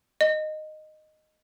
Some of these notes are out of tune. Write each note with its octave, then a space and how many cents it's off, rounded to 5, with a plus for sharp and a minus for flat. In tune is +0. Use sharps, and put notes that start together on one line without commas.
D#5 -10